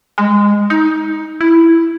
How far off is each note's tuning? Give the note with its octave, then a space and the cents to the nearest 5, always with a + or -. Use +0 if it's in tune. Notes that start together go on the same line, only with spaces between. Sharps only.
G#3 -15
D#4 +20
E4 +5